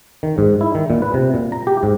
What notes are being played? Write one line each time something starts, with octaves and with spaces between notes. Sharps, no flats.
D#3
G#2
E4
D#3
A#2
B4
C3
A#2
A#5
G4
G#2